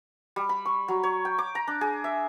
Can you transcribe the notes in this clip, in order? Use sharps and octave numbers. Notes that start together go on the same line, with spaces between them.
G3
B5
C#6
F#3
C#5
G5
D6
A#5
D4
G#4
E5